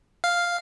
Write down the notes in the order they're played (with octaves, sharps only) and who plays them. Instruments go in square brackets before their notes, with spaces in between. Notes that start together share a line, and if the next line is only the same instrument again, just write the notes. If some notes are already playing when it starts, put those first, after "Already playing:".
[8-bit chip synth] F5